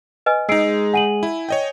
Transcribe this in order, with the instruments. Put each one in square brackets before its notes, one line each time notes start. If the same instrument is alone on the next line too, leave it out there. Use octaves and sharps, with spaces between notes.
[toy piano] B4 D#5 G#5
[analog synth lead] G#3 [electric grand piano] D#4 G#4 [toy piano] D#5 [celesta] E6 C7 D7
[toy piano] F#5 [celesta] G#5 D#7 F#7
[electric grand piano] E4
C#5 D#5 G5